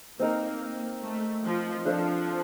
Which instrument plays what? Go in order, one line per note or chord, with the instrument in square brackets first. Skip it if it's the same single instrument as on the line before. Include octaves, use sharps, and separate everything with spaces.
[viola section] A#3 [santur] C4 D#4 A#4
[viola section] A3
F3
[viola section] F3 [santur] D4 A4 C5 F5